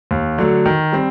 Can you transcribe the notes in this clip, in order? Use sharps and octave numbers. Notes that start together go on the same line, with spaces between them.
D#2
D3 F#3 A3
D#3
G3 C4